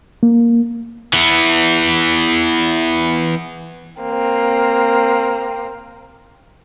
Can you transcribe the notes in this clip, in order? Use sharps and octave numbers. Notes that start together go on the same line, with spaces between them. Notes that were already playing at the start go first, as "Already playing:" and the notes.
A#3
E3 B3
A#3 C4